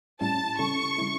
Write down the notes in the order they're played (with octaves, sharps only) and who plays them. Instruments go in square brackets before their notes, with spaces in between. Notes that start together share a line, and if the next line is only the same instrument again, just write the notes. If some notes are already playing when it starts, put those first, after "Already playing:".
[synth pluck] A2 G3 C#4 E4 [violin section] A5
[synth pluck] C#3 G3 C#4 E4 A4 [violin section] C#6
[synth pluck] C#3 G3 C#4 E4 A4